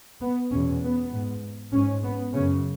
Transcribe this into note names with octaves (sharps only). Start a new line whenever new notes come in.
B3
E2 B2 C#4
B3
G#2
G#2 C#4
B3
F#2 C#3 C#4